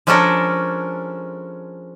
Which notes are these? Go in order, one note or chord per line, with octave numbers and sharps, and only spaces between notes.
F3 G#3 C#4 D4 A4 A#4